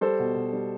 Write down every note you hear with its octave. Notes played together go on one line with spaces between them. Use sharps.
G3 A4 C5
B2
B2
G3